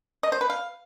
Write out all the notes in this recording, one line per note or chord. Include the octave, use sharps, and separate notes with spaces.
D#5
C5
B4
F5